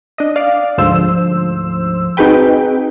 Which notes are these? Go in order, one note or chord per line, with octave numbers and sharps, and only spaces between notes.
D4 D#5
D5 F5
D2 G#2 F3 C5 E6
C4 D#4 F#4 G#4 B4 G5